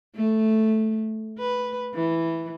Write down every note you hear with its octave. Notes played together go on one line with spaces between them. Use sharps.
A3
B4
E3